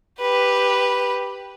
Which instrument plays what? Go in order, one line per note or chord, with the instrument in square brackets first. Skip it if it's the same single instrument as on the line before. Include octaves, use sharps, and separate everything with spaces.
[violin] G4 B4